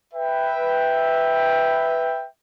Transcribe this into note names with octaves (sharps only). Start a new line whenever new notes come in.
B4 E5 G5